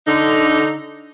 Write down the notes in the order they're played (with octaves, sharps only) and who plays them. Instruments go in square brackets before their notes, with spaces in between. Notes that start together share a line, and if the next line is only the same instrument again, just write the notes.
[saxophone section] D3 D#4